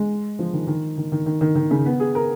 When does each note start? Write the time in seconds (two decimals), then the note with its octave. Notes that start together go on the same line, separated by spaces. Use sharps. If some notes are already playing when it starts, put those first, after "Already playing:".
Already playing: G#3
0.39 F3
0.53 D#3
0.67 D#3
0.98 D#3
1.12 D#3
1.26 D#3
1.41 D#3
1.55 D#3
1.71 C#3
1.86 B3
2.00 G#4
2.15 A#4